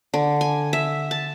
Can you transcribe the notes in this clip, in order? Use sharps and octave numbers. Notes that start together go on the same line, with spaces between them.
D3
G#5
E5
A5